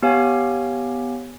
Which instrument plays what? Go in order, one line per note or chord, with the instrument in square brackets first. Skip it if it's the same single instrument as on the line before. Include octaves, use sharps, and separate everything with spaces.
[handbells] B3 G4 C#5 F5 G#5